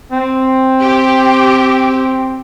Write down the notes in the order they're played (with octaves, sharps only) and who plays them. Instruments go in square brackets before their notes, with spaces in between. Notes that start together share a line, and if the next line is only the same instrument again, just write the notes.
[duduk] C4
[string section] G4